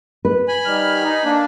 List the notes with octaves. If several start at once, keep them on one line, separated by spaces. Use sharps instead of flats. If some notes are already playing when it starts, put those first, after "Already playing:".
B4
G#5 B5
D#3 G3 F6
D#4
A#3 D4